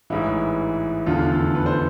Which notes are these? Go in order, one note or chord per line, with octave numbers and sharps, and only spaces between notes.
A1 G#2 E3 E4
F1 E2 D3 F4
A4
B4
C5